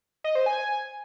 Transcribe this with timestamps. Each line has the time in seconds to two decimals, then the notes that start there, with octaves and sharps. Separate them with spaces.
0.24 D#5
0.35 C5
0.46 G#5